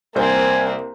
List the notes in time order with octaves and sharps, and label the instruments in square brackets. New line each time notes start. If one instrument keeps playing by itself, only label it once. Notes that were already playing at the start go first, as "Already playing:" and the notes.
[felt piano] C2 C5 [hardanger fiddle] A#3 C4 [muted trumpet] G#5